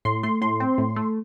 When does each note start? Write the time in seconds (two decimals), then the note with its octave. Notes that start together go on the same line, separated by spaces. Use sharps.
0.05 A2 C6
0.23 A3 C6
0.42 A2 C6
0.60 C4
0.78 A2
0.96 A3